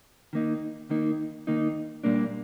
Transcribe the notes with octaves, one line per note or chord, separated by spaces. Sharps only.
D#3 A#3 D#4
D#3 A#3 D#4
D#3 A#3 D#4
A#2 G3 A#3 D4